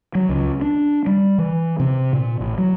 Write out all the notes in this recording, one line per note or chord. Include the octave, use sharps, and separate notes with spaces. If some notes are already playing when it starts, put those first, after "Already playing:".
F#3
C#2
D4
G3
E3
C3
A#2
A1
F#3